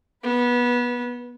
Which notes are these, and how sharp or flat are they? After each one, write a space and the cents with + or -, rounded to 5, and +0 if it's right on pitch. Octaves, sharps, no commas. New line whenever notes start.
B3 -20 B4 +0